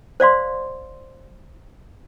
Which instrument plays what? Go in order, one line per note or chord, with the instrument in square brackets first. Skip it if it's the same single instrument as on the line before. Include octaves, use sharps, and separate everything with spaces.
[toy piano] C5 D5 F5 C6